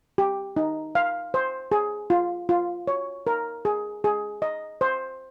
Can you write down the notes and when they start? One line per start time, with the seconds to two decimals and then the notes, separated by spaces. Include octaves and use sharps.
0.18 G4
0.57 D#4
0.95 F5
1.34 C5
1.72 G#4
2.10 F4
2.49 F4
2.87 C#5
3.27 A#4
3.65 G#4
4.04 G#4
4.42 D#5
4.81 C5